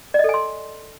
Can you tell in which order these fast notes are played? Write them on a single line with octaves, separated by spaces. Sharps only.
D5 D#5 A4 G#5 C6